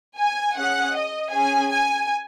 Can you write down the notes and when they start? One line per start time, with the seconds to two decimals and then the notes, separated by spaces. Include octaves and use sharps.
0.17 G#5
0.56 C#4 G#4 F#5
0.94 D#5
1.32 C#4 G#4 G#5
1.71 G#5